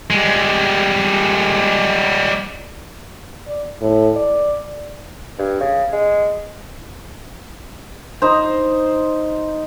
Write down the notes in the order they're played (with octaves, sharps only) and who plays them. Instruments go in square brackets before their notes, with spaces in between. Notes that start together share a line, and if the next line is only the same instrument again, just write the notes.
[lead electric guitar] G3 G#3
[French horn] D5
A2
D5
[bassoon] G2
C#3
G#3
[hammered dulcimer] D#4 C5